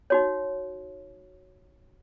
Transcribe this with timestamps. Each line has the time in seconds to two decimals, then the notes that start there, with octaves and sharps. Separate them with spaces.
0.10 D#4 F#4 C#5